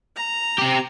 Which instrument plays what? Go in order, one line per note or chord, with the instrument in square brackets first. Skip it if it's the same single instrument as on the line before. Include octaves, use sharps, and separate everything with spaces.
[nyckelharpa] A#5
[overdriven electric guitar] C4 G4